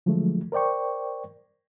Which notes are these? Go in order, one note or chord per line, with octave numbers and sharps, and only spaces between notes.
D3 F3 F#3 G#3 A3
A#4 C5 D5 G5 C#6